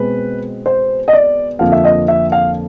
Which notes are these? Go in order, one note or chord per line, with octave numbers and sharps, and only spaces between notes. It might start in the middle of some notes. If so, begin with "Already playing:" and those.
Already playing: B2 G#3 C4 B4
C5
D#5
D5
F2 D3 F3 A#3 F5
E5
D#5
E5
F5